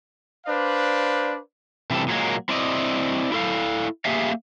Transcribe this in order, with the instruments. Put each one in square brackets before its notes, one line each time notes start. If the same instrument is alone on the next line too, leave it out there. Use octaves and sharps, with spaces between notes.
[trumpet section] D4 B4 C5 D5 F5
[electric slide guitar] C3 E3 G3 A4
A#2 F#3 G#3 A#3
C4 E4 D5 D#5
E4 A4 F5
A#3 G4 G#4 E5 F5